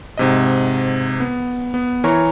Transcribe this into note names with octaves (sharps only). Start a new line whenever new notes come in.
G#2 C3 D#5
B3
B3
E3 A#4 C#5 A#5 C#6